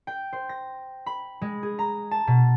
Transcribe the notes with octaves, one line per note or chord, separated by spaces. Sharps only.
G5
C5
A#6
B5
G#3
G#4
A#5
A5
B2